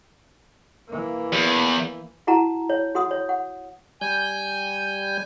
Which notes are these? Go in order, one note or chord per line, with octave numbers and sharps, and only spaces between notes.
E3 A#3
E2
E4 F#4 F#5 A5 A#5
C#5
F#4 F#5 C6 D#6
C#5
F#5
G3 G#5 G6